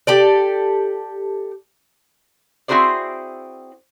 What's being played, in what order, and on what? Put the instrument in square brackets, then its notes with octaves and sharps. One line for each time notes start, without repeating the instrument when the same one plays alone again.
[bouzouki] G4 A4 D5
[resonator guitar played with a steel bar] C4 E4 F#4 G#4 C5 D5